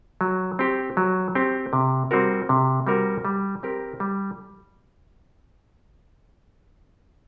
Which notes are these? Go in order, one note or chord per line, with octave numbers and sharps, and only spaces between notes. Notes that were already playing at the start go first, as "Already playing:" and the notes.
F#3
C4 G4
F#3
C4 G4
C3
G3 C4 F#4 A#4
C3
G3 C4 F#4 A#4
G3
C4 G4 A#4
G3